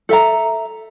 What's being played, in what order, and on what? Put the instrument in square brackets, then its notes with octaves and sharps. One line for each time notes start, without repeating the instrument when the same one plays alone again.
[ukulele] A4 E5 A#5